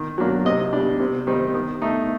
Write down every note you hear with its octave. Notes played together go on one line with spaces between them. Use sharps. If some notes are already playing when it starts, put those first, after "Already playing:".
Already playing: D#3
F#3 A#3 D4
C3 D#5
G3 D4
C3
D#3 G3 C4 D#4
D#3
A3 D#4